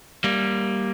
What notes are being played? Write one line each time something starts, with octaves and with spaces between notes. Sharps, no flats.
G3 A#3